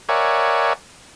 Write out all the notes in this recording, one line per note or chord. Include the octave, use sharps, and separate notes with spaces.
A#4 C#5 D5 E5 F#5 G#5